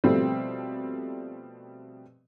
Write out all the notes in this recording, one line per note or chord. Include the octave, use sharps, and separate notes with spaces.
B2 F3 G3 A3 C4